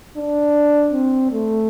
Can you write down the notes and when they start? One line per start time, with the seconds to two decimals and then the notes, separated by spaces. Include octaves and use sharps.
0.17 D4
0.93 C4
1.32 A3